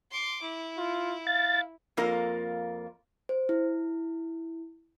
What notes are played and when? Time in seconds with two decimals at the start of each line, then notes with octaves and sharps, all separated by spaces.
0.11 C6 D6
0.41 E4
0.77 F4
1.27 F5 A6
1.97 F2 A#3 F4 A#4
3.29 C5
3.49 E4